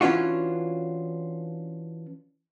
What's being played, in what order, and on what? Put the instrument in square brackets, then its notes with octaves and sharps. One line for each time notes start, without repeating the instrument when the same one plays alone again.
[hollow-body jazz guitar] E3 C#4 D4 F4 F#4